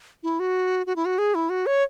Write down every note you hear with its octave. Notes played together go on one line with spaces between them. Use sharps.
E4
F#4
F#4
E4
F#4
G#4
E4
F#4
C#5